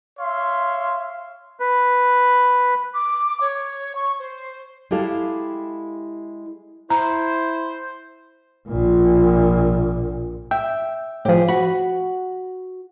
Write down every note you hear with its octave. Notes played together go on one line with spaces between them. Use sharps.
C#5 E5 F5 C6
B4
D6
C#5
C#6
C5
G#3 E4 G4 A4 F5
E4 C5 A#5
A#1 A#2
E5 G5
A2 F3 G4 G#4
F#4 B5